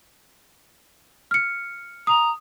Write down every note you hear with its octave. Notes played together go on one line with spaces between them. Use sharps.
F6 C#7
A#5 D#6